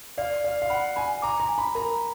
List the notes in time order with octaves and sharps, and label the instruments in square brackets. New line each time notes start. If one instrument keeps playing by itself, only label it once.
[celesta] D5 [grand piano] F5
[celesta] D5 [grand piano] F5
[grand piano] F5
[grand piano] F#5 [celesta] B5
[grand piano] G#5 [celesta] B5
[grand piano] A#5 [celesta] D6
[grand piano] A#5
[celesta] G#5
[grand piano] B5
[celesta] A#4 [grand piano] A#5